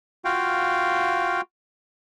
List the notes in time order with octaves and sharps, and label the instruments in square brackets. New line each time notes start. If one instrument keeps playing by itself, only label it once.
[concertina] F4 F#4 F5 G5